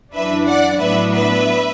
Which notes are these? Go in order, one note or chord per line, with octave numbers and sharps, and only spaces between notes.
F#2 E3 D4 B4 E5
D5 F#5
A2 F#3 B3 D4 B4 E5
B4 E5